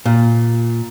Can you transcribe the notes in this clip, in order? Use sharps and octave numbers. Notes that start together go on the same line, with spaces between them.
A#2